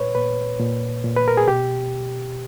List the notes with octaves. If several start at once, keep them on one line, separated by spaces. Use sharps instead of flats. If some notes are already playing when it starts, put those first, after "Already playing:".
Already playing: A#2 B4 C#5
A#2 B4
A#2
A#2
B4
A#4
G#4
B2 G4